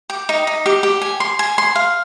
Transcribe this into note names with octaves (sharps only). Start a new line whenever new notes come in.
G4
D#4
D#4
G4
G4
G#5
C6
G#5
C6
F5